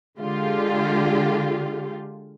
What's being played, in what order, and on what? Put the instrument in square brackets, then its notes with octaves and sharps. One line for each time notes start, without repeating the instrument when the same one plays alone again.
[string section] D3 G#3 F4 G4